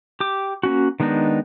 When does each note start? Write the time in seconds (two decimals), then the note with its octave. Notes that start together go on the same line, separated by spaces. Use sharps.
0.20 G4 D6
0.63 A#3 C#4 F#4
1.00 D#3 G#3 B3 D4 D#4